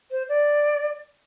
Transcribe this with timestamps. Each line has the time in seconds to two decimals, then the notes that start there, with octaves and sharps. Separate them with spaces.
0.11 C5
0.29 D5